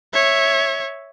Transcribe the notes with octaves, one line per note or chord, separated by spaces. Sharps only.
C#5 E5